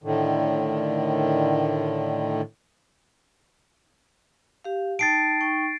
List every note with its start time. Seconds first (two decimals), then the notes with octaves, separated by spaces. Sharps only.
0.04 A2 D3 D#3
4.64 G4 F5
4.99 D#4 G5 A5 A6 C7 D7
5.41 D#4 G5 C#6